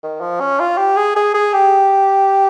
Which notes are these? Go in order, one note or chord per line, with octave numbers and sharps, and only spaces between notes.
D#3
F3
C#4
F4
G4
G#4
G#4
G#4
G4